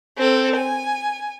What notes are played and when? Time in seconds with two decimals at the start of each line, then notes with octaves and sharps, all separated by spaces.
0.17 C4 A4
0.56 G#5